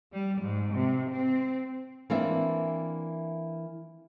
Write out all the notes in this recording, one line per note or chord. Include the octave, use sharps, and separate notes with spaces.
G3
G#2
C3
C4
E3 A#3 C4 D4 E5